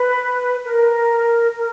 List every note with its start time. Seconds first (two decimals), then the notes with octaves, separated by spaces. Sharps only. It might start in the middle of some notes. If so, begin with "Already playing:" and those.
Already playing: B4
0.65 A#4
1.56 A#4